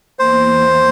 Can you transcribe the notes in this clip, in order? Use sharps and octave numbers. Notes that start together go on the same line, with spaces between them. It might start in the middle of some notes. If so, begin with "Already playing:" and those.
E2 E3 A#3 C5